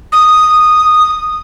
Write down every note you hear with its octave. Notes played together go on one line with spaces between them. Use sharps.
D#6